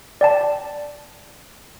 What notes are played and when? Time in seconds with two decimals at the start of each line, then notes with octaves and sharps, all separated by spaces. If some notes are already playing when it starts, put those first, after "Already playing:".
0.21 D5 G5 A5